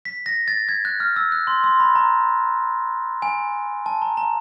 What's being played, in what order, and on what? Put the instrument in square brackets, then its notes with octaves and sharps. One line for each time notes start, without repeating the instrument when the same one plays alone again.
[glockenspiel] B6
A#6
A6
G#6
F#6
F6
E6
F#6
C6
C6
B5
A#5
G#5
A5
A#5
A#5